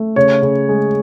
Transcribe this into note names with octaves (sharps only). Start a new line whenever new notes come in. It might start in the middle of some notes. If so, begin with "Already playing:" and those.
Already playing: A3
C#3 C#5
C#3
G#3